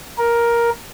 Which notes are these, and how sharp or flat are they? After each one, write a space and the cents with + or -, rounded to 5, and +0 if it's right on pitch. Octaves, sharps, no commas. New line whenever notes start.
A#4 +10